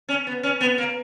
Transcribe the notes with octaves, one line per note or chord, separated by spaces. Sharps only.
C#4
B3
C#4
B3
A#3